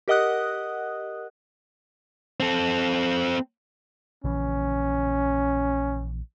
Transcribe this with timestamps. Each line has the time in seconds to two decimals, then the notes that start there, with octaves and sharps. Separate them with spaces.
0.08 G4 A#4 D#5 F#5 D#6 F#6
2.40 C4 A4
4.24 A#1 C#3 E3 C#4